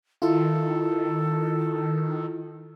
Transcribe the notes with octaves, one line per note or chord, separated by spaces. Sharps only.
D#3 E4 F4 A4